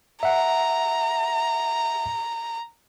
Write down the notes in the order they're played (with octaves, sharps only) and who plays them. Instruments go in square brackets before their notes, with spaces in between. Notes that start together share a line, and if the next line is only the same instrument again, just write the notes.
[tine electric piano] E5 F#5 [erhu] A#5